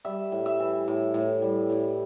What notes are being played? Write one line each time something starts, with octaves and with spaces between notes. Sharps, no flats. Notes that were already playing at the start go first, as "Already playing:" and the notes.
G3 E5
A2
E5
E3
A2
A2
G3
A2